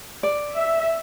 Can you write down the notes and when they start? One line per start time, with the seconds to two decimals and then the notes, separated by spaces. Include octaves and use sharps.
0.23 D5
0.54 E5